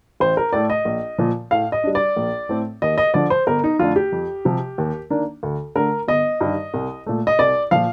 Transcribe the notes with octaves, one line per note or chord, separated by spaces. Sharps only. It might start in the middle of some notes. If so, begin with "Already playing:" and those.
A1 C5
A#4
A2 A3 D5
D#5
A#1
A#2 F3
A2 F5
D#5
G3 D4
D5
A#1
A2 A3 C4
D#2 D#5
D#5
D3 F3 D5
C5
G1 A#4
D#4
F2 D3 A3 D4 F4
G4
F2
C3 F3
D#2
D#3 A#3 D4
D2
D3 A3 D4 A#4
G1 D#5
G2 D#3
C2
A#2 A3
D#5
C2 D5
A#2 F3 F5